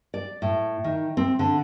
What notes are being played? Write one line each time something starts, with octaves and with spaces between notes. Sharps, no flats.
D5
A2
D#3
C4
D3